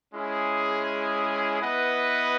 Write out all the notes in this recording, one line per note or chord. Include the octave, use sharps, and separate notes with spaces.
G#3 C#4 E4 G#4
B3 E4 B4 D#5 F#5